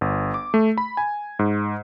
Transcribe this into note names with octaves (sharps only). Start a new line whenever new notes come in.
G1
D6
A3
B5
G#5
G#2